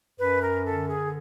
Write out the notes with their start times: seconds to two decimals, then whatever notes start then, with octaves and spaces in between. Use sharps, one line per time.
0.19 F#2 B4
0.43 A#4
0.66 D3 A4
0.89 G#4